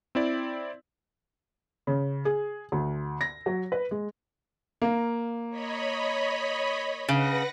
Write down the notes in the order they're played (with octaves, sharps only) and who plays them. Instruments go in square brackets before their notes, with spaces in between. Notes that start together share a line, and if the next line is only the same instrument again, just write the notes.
[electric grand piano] C4 E4 D5
[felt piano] C#3
G#4
D2
A#6
F#3
B4
G#3
[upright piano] A#3
[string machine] C#5 D#5 B5
[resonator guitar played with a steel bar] C#3 [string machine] B4 F#5 A#6 [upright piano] D7